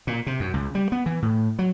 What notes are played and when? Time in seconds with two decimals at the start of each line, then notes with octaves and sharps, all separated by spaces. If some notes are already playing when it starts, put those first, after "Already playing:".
0.07 A#2
0.27 C3
0.40 F#2
0.54 C#2
0.75 G3
0.92 B3
1.06 E3
1.22 A2
1.59 F#3